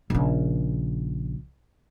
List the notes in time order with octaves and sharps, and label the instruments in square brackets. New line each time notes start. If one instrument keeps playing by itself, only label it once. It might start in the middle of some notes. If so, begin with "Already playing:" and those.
[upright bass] A#1 C#3